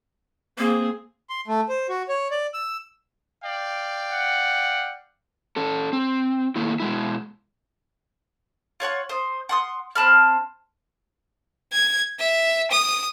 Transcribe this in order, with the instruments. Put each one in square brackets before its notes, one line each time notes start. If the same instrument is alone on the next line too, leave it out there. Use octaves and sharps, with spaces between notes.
[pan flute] A#3 [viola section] C4 G#4
[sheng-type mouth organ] C6
A3
C5
F#4
C#5
D5
E6
[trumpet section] D5 F5 G5
[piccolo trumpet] F#5
[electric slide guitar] C#4 A4
C4
D#3 A3 A#3 E4
B2 G#3 E4
[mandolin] F4 C#5 F#5 C#6
C5 D#5
F#5 C6 D#6
C4 A5 B5 F6
[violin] G#6
E5
D#6